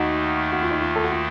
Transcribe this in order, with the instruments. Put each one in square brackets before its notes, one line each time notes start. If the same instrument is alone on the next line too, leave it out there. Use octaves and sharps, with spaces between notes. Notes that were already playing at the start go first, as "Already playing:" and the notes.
Already playing: [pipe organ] D#2 D#3 A3 [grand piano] D#4 F#4
[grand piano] F#4
F4
D#4
F4
A4
F#4
F4